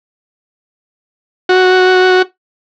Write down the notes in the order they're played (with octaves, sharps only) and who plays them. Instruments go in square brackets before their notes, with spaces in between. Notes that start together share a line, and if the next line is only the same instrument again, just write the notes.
[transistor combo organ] F#4